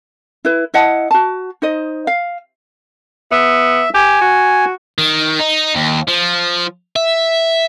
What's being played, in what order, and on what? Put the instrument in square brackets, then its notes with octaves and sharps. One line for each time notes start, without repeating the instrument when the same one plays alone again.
[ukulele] E4 B4
E4 D#5 F#5 A5
F#4 A5
D#4 C5 D#5
F5
[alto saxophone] B3 [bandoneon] E5
[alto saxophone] G4 [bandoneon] G#5
[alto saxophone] F#4
[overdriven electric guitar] D#3
D#4
D#2
F3
E5